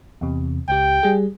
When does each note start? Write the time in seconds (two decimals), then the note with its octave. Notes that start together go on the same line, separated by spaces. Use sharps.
0.21 E2 C3
0.69 C#2 G4 G5
1.03 G3 G#4